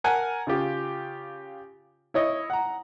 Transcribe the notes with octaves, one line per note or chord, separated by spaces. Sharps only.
A#4 F#5 G#5 A5
C#3 F4 G4
E4 C#5 D#5
F#5 A#5